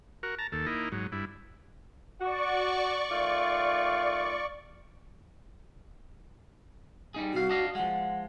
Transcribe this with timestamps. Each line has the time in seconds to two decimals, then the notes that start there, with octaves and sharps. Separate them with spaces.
0.23 F#4 A#4
0.39 A5 A#5
0.52 D#2 A4
0.67 A#3 D#4 E4
0.92 G#2 F#3
1.12 G2 E4
2.21 F#4 D5 C#6
3.11 D#3 A3 F4
7.14 G3 D#4 G#4
7.34 C2 F#4 F5
7.49 D4 D#5 F5
7.75 F3 G#3 F#5